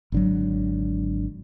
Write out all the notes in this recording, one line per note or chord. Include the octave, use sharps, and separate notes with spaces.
G#1 D3 F#3